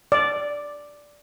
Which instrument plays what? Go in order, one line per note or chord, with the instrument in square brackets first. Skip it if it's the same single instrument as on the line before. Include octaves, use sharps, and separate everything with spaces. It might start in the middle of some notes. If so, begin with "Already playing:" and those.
[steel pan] D5